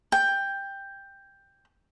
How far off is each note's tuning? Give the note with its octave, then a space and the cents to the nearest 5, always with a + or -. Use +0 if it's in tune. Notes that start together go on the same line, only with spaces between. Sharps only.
G5 +10